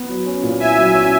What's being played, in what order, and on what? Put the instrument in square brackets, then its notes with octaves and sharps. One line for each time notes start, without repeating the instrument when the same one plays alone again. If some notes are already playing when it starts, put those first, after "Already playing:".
Already playing: [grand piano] B3
F#3
C#4
A#2
[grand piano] E4 [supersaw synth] E5 G#5
[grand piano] F#3
C#4